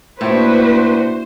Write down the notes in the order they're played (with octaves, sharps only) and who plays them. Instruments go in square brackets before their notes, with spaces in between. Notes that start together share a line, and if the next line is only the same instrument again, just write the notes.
[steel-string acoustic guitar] A2 [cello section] A#3 D4 F#4 [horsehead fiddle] B4 [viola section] C5